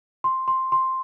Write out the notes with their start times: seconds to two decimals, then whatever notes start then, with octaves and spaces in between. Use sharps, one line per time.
0.24 C6
0.48 C6
0.72 C6